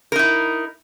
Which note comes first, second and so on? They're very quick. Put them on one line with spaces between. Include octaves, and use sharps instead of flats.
A#4 D#4 E4